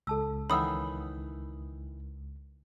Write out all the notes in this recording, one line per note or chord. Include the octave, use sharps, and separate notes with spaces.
C#2 A4 A5 E6
D#3 E3 C#5 F#5 B5 D#6 E6